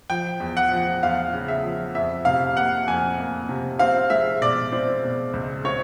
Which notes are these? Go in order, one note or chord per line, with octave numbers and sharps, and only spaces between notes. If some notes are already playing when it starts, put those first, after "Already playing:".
F3 G5
E2
F#5
F3
E2 F5
C#3
E5
F3
F2 E5
C3 F5
A#3 F#5
F2 G#5
A#3
C3
C4 F5
G#3 E5
B2 D5
C4
B2
C#2
C4 C#5